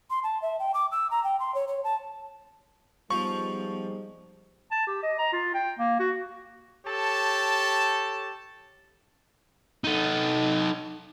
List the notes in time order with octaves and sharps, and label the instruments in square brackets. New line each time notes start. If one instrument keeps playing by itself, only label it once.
[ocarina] C6
A5
E5
G5
D6
E6
A#5
G5
C6
C#5
C#5
A5
[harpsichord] F3 [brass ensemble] G3 G#3 D#4 [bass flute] B3 [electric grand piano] C#6
[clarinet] A5
G4
D#5
A#5
F4
G5
A#3
F#4
[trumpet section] G4 A4 C#5 A5
[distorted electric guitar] D#4 A4